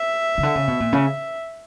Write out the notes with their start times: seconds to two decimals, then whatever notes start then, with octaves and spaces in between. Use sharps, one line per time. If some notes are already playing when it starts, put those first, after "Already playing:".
Already playing: E5
0.38 C#3
0.43 D3
0.55 C#3
0.68 B2
0.80 A#2
0.93 C#3